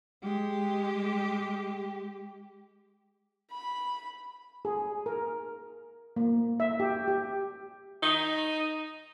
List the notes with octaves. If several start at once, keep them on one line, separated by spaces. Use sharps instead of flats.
G#3 G4
B5
G#4
A#4
A#3
E5
G4
G4
D#4